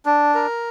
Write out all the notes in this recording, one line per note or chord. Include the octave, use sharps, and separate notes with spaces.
D4
A#4